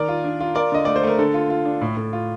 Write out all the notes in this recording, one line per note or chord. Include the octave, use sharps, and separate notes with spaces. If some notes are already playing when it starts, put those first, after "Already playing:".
Already playing: D#3 A#4 D5
F4
D4
F4
F4 A#4 D5
D3 D#5
A3 D5
C5
A3 A#4
D3 A4
F4
F4
D4
A2
A2
F4